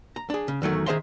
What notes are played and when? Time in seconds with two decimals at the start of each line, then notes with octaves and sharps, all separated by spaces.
0.16 A#5
0.30 D4 G#4
0.48 C#3
0.62 E2 D#3 F#3 A3
0.86 D#3 G#4 C5 E5 A#5 C6